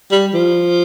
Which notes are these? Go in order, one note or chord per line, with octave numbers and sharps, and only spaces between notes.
G3
F3